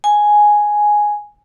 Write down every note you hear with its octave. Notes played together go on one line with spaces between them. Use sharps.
G#5